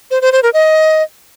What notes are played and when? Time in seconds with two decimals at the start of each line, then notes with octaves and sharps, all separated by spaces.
0.11 C5
0.22 C5
0.32 C5
0.43 A#4
0.54 D#5